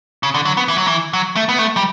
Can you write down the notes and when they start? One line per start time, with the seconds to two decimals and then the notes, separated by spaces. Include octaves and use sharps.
0.23 C#3
0.34 D3
0.46 F#3
0.57 B3
0.68 E3
0.78 F#3
0.87 E3
1.13 F#3
1.36 A3
1.49 B3
1.59 A3
1.77 G3